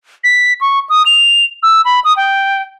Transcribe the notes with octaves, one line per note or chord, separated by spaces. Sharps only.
B6
C#6
D#6
F7
E6
B5
D#6
G5